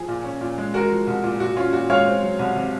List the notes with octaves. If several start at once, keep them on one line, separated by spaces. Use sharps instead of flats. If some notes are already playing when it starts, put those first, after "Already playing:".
Already playing: F3 G#4
A#2
C#4
A#2
G#3
G#3 F#4 A#4
F3
C2
A#2
A#2 F#4
C#4 F4
A#2 F#4
G#3 C#5 F5
C4
F#3
C2
C3